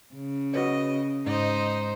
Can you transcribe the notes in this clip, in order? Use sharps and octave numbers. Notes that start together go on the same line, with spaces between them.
C#3
F#4 B4 C#5 D#5
G#2 D#4 C5 D#5